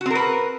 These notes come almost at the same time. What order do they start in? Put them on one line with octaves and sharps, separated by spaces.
F#4 C4 A#4 B4